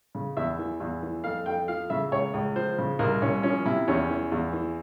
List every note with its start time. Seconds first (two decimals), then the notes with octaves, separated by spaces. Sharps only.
0.15 C#3
0.37 E2 E5
0.59 E3
0.80 E2
1.02 E3
1.24 F2 F5
1.46 F2 G5
1.68 F3 F5
1.90 C#3 E5
2.12 C#2 C#5
2.34 C#2
2.56 F3 C5
2.78 C#3
2.99 C2 A#4
3.22 C2 C#4
3.43 F3 C#4
3.66 C3 E4
3.88 E2 C#4
4.10 E3
4.32 E2
4.53 E3